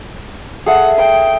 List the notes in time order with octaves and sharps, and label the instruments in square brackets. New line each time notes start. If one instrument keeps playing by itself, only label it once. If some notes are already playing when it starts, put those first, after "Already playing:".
[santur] G#4 A4 E5 [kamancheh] F#5
[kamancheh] G5